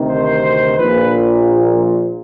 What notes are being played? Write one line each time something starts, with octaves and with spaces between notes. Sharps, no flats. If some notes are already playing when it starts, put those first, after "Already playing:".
Already playing: D2 C3 D#3
C5
A#1 A#2 B4